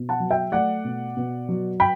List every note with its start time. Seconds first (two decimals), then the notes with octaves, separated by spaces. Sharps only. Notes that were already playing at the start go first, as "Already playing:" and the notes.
Already playing: B2
0.09 F#5 A5
0.20 F#3
0.30 E5 G5
0.52 A3 D5 F#5
0.84 B2
1.17 B2
1.49 F#3
1.80 G5 B5